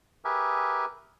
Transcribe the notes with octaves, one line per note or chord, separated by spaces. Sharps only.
G4 G#4 A#4 B4 E5 G#5